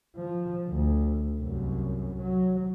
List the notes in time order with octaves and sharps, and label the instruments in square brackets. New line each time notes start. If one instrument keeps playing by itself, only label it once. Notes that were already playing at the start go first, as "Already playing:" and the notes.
[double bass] F3
D2
C2 F#2
F#3